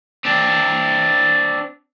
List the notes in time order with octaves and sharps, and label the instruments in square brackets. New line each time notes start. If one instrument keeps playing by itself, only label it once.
[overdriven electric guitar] C4 D4